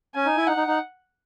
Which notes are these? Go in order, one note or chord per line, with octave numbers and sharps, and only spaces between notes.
C#4 G#5
D#4
E4
D#4 F#5
D#4
D#4